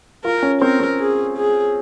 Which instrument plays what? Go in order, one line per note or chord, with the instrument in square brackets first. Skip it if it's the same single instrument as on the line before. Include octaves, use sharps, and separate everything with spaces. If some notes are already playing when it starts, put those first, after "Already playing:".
[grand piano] F4 [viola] A#4
[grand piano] C#4
[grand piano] C4 [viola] A#4
[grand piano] C4
[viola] G#4
G#4